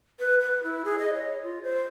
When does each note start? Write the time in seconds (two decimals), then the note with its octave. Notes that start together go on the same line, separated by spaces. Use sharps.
0.20 B4
0.41 B4
0.63 E4
0.85 G#4
0.99 D#5
1.14 C#5
1.43 F4
1.63 C5